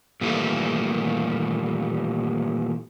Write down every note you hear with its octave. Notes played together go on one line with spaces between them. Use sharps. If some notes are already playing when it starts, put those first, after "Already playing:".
A#2 D#3 E3 G3 A3 A#3